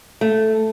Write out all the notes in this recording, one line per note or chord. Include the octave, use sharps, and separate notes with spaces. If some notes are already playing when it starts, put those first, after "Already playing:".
A3